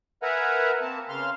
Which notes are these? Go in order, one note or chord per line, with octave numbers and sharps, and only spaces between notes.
A#4 B4 E5 F#5 G#5 A#5
A#3 C4 A5
C#3 F5 C6 F6